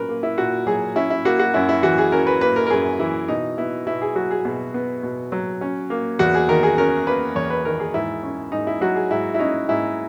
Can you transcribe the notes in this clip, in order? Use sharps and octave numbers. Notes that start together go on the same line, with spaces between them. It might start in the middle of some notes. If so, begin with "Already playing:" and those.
Already playing: A#2 F#3 C#4 A#4 B4
A#3
E4
A#2 F#4
F#3 G#4
C#4 E4
E4
A#3 F#4
F#4
F#2 E4
E4
E3 F#4
G#4
C#4 A#4
B4
A#3 B4
A#4
A#4
F#2 G#4
E3 E4
B2 D#4
B3 E4
B2 E4
G#4
F#3 F#4
G#4
B2 G#4
B3
B2
F#3
C#4
A#3
E2 F#4
G#4
D#3 A#4
G#4
C#4 A#4
A#3 B4
E2 C#5
B4
D#3 A#4
G#4
G#2 E4
C#4
G#2 D#4
E4
F#3 F#4
G#4
G#2 E4
E4
C#4 D#4
G#2 E4